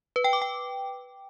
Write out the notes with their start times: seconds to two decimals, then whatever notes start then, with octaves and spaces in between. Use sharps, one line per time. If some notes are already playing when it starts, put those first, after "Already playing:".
0.16 B4
0.24 G5
0.33 D6
0.42 G5